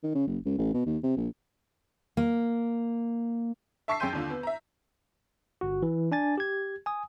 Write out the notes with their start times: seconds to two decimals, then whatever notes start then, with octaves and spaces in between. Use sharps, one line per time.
0.04 D#3
0.15 C#3
0.27 F#1
0.45 C#2
0.58 A1
0.74 B2
0.86 D#2
1.04 C3
1.17 A#1
2.17 A#3
3.88 E5 A5 C#6 E6 B6 C7
4.00 F#2 G#4 G5 C6 G6 D#7
4.13 D#2 D3 F4
4.30 B3
4.43 E5 A#5
5.61 G1 F#4
5.83 E3
6.12 D4 G#5 A6
6.38 G4 G#6
6.86 G#5 D#6